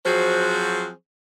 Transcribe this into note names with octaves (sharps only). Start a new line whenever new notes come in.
F3 F#3 C4 F#4 G#4 C5